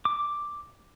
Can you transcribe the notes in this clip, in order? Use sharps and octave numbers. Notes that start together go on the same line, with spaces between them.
D6